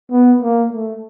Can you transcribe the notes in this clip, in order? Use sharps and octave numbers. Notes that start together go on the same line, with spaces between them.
B3
A#3
A3